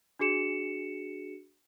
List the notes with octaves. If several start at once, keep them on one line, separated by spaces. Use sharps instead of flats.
D4 F#4 G#4 C#7 E7